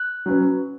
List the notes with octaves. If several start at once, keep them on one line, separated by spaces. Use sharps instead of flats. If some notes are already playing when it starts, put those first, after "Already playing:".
Already playing: F#6
F#3 C#4 B4